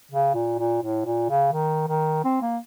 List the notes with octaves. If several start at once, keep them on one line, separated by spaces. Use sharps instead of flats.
C#3
A#2
A#2
A2
A#2
C#3
D#3
D#3
C4
A#3